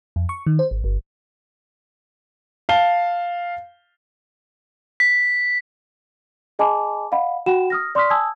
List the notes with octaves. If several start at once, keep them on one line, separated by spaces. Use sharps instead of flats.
F2
C#6
D#3
C5
G#1
G1
F5 A5 G7
B6
G#4 D#5 G#5 A5 B5 D6
D#5 F5 F#5 B5
F#4 F#5 G5 B5 E7
D#6 F6 A#6
D5 C6 C#6 D#6 F6 B6
G#5 A5 D#6 E6 G#6